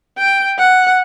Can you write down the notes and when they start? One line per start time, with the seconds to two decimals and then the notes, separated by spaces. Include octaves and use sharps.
0.18 G5
0.58 F#5